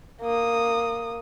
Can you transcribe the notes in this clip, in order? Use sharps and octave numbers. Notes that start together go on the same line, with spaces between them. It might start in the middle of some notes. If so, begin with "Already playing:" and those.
A#3 D#6